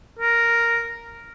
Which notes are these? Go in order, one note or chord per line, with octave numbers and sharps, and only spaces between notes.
A#4